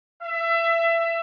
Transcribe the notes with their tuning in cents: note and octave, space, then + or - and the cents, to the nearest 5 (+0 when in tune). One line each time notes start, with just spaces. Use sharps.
E5 +25